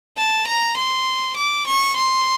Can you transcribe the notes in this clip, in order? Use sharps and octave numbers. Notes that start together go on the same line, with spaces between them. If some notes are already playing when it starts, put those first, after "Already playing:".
A5
A#5
C6
D6
C#6
C6